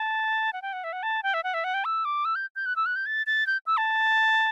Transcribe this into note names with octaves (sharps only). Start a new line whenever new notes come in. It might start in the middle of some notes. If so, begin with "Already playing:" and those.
Already playing: A5
F#5
G5
F#5
E5
F#5
A5
G5
E5
F#5
E5
F#5
G5
E6
D6
E6
G6
G6
F#6
E6
F#6
G6
A6
A6
G6
E6
A5